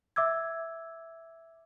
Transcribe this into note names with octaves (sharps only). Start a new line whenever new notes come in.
E5 D6 E6 G#6